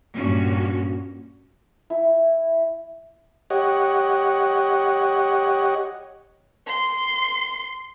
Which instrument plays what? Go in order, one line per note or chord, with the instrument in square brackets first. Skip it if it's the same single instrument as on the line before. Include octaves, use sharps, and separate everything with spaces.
[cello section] G2 A#2 C#4 F#4
[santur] E4
[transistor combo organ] G4 C#5 D#5 F#5
[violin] C6